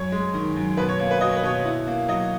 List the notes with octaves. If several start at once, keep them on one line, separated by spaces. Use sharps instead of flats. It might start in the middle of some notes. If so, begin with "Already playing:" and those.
Already playing: F#2 C#5
G#3
D#3
F#2
B2 B4
C#5
A#3 C#5
B4
F#3 D#5
C#5
B4
B2 C#5
E4
A#3
F#3 D#5